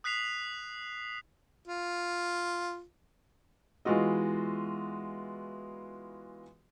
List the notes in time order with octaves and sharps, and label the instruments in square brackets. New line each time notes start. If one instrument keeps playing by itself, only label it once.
[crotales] D#6 F#6 B6 C7 F7
[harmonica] F4
[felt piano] E3 G#3 B3 F4 F#4 D#5